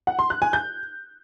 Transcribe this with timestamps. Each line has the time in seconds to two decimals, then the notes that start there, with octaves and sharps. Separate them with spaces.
0.07 F#5
0.19 C6
0.30 F#6
0.42 G#5
0.53 G6